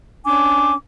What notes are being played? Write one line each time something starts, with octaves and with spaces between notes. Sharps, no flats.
C#4 D4 G#5 D6